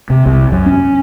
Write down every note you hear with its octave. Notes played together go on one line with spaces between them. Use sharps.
C3
C2
F#2
C#4